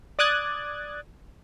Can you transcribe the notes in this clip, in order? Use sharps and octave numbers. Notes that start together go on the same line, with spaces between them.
D5 D6 D#6 F#6 G#6 A6